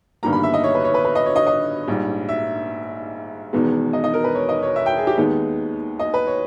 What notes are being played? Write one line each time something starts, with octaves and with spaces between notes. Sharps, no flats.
G1 G2 D#3 G3 A#3 A#5
B5
E5
D#5
C#5
B4
C#5
B4
B4
D#5
C#5
D#5
D#5
A#1 G#2 G3
E5
E1 E2 D#3 G#3 B3
D#5
D#5
A#4
B4
C#5
D#5
C#5
E5
G5
G#4
G4
D#2 D#3 G#3 B3 D#4
D#5
B4
C#5